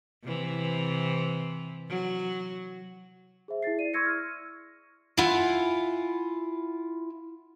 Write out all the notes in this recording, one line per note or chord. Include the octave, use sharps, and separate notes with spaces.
C3 E3
F#3
G#4 C5 E5
E4 G#4 A6 C7
E4 D5 D#7
C6 C#6 E6 G#6 A#6 C#7
F6
E4 F4 F5 F#5 G#5